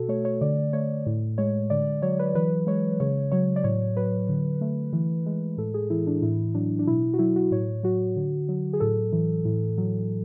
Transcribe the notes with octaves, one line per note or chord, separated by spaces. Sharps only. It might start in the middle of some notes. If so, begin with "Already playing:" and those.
Already playing: B2 F#4 A4
A3 C#5
C#5
D3 D5
A3 C#5
A2
G#3 C#5
D3 D5
F#3 C#5
B4
E3 B4
G#3 C#5
C#3 C#5
F#3 C#5
D5
A2 C#5
F#3 B4
D3
A3
E3
G#3
A2 A4
G#4
E3 E4
D4
A2 E4
F#3 D4
D4
B2 E4
F#4
F#3 E4
F#4
A2 C#5
F#3 F#4
D3
F#3
G#4
A2 A4
E3
A2
F#3